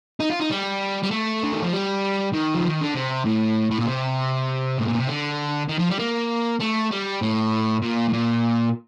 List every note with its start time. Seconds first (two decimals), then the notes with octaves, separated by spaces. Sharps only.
0.20 D#4
0.30 F4
0.40 D#4
0.50 G3
1.03 G3
1.11 A3
1.44 D3
1.54 D#3
1.63 F3
1.73 G3
2.33 D#3
2.54 F3
2.68 D#3
2.81 D3
2.95 C3
3.25 A2
3.71 A2
3.78 A#2
3.86 C3
4.78 A2
4.88 A#2
4.98 C3
5.08 D3
5.69 D#3
5.79 F3
5.90 G3
5.99 A#3
6.60 A3
6.91 G3
7.22 A2
7.82 A#2
8.09 A2
8.13 A#2